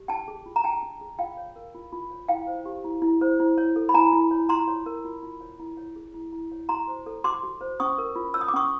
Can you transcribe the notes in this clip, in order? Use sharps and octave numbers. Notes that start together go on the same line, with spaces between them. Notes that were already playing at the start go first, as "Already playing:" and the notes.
Already playing: G4
D4 G5 A5
G#4
F4
A#5
D4 G5 A5
D4
G#4
F4 F5 G5
C#5
A#4
F4
F4
C#5
E4 F5 G5
C5
G4
E4
E4
C5
E4
C#5
A4
B5
E4 G#5 A#5
E4
C#5
F4 A#5 C6
C#5
A#4
F4
F4
C#5
E4
C#5
G#4
E4
E4
C#5
F#4 A#5 C6
C5
A4
F#4 C6 D6
F#4
C5
C#4 C#6 D#6
A#4
F4
C#5 E6
D#6
D6
C#4 C#6 D#6